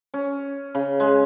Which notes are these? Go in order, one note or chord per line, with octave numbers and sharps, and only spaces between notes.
C#4
C#3
G#3